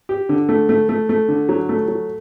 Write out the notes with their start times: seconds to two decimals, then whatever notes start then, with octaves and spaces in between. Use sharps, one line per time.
0.09 G4
0.29 D3
0.49 A3
0.69 A3
0.89 A3
1.09 A3
1.28 D3
1.49 F#3
1.69 A3
1.88 F#3